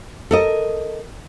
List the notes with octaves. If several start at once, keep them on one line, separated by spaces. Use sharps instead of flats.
A4 A#4 D#5